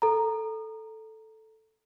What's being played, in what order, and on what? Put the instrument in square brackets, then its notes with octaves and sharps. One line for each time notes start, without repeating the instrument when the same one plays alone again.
[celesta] A4 A#5